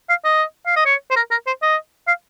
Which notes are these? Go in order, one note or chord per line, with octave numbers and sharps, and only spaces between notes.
F5
D#5
F5
D#5
C#5
C5
A#4
A#4
C5
D#5
F5